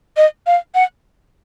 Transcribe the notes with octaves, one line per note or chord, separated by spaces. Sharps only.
D#5
F5
F#5